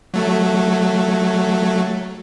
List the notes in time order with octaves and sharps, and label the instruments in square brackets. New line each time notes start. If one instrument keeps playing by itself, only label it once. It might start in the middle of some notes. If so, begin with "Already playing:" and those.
[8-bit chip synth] F#3 A3